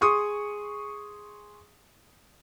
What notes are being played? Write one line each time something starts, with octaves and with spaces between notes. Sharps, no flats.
G#4 C6 C#6 D#6